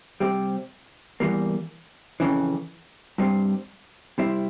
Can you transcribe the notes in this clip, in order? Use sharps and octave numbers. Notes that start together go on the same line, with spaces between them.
C3 G3 C4 G4
E2 E3 G3 A#3
F2 C#3 E3
G2 G3 C4
C3 G3 C4 E4